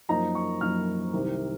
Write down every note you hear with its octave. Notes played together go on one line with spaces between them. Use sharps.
F#2 F3 A#3 D#4 A#5
C#6
F#2 F3 A#3 D#4 F6
C2 C3 D#3